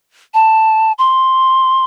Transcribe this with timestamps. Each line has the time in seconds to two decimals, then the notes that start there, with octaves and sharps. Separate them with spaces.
0.34 A5
0.98 C6